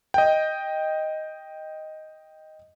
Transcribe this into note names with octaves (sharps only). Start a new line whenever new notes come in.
D#5 G5